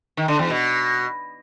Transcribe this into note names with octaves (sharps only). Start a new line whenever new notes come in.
D#3
D3
E2
B2